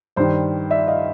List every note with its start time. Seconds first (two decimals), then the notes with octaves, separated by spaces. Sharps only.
0.16 G2 D#3 C5 D5
0.70 D5 E5
0.87 D#5 F5